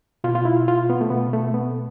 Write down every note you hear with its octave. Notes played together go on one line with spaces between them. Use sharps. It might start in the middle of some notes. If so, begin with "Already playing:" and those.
B2 F4
F4
E4
F4
B3
A3
B2 B3
A3
B3